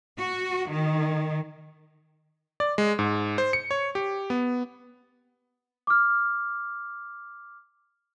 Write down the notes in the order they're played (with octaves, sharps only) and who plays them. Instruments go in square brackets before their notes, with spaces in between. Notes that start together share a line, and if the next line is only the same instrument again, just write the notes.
[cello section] F#4
D#3
[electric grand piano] D5
G#3
G#2
C5
C#7
C#5
G4
B3
[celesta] D6 F6